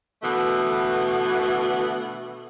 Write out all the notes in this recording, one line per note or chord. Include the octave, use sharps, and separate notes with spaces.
B2 D3 E3 A3 B3